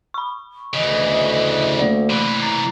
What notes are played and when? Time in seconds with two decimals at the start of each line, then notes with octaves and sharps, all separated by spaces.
0.14 B5 C#6
0.74 D2 C#3 E3 D#5
1.79 A3 A#3 D5
2.10 C3 E3 B5
2.41 A#5 A6 C7